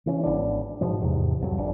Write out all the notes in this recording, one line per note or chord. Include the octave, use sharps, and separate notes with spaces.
C#3 E3 C#4
G#1 B2 B3 D4
G#2 B2 F3
E2 G#2 C3
C2 F2 F#3
G1 F2 D4